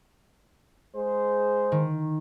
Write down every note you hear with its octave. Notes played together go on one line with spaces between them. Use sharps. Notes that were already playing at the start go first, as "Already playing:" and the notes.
G#3 G#4 C5
D#3